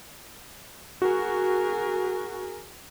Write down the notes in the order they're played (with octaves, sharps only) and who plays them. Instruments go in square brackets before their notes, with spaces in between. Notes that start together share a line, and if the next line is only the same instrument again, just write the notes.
[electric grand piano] F#4 [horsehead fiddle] G#4 A#4